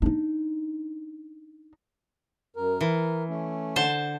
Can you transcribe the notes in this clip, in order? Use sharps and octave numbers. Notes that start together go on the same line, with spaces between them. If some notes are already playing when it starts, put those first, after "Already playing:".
D4 D#4
F#2 A#4
E3 A#4
A3 C#4
D3 C5 A5